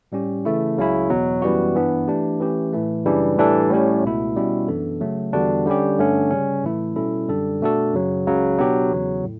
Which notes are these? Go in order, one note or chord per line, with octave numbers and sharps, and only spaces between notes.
A2 G3 C#4 G4
C#3 E3 A3 E4
C#2 C#3 F#3 C#4 E4
E2 B2 F#3
F#2 E3 G3 B3 F#4
G2 E3 B3 D4
E3 A3 D4 G4
E3 A3 C#4 G4
A2 E3 A3
F#2 C#3 E3 G3 D4
A2 E3 G3 D4 A4
A2 G3 C#4 G4
C#2 B2 A3 E4
B2 G3 C#4 E4
F#2 E3 B3 D4 A4
C#3 F#3 A3
E2 D3 G3 D4 F#4
D3 G3 C#4 G4
G2 D3 A3 C#4
C#3 G3 C#4
A2 E3 A3 E4
B2 G3 C#4 E4 A4
F#2 D3 G3 D4 A4
B2 A3 D4 F#4 A4
F#2 C#3 F#3
C#2 C#3 F#3
B2 F#3 B3 D4 G4
E2 C#3 F#3
A2